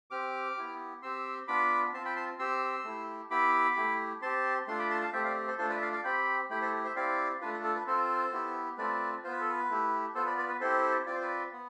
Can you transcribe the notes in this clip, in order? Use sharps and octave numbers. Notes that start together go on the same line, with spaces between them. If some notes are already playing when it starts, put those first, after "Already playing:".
C4 G4 D6 F6
B3 E4 G4
C4 G4 C6 E6
B3 D4 F4 B5 D6
C4 F4 A5 C6
G5 B5
A5 C6
C4 G4 C6 E6
A3 E4 G4
B3 E4 G4 B5 D6
A3 E4 G4
C4 G4 A5 C6
A3 D4 F4 C6
B5 D6
A5 C6
F5 A5
A3 C4 G4 E5 G5
D5 F5
A4 C5
A3 D4 F4 A4 C5
B4 D5
E5
D5 F5
D5 F5
C4 G4 G5 B5
A3 E4 G4 G5 B5
A4 C5
C5 E5
C4 E4 G4 D5 F5
A3 D4 F4 B4
A4
A4
B4
C4 F4 A4 C5
B3 E4 G4
A3 C4 F4 B4 D5
B3 F4 C5
B4
A4
B4
A3 E4 G4
B3 F4 A4 C5
B4 D5
B4 D5
B4
C4 E4 G4 A4 C5
C4 F4 D5
C5
B4 D5
B3